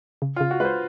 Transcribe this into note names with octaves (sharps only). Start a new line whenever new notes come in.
C#3
C#3 F4
F#4
G#3 B4 C5